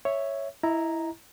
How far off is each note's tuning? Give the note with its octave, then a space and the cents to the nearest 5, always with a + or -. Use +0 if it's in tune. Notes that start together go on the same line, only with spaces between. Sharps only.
C#5 +0 E5 +0
E4 +0 D#5 +25 A#5 +0